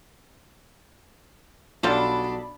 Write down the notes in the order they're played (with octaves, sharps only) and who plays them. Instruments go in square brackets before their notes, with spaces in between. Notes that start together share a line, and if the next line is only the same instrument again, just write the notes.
[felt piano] B1 F#4 [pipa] G3 F4 A4 [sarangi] D4 [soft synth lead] B5